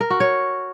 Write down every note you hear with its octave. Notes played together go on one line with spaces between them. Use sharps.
A#4
F#4
C#5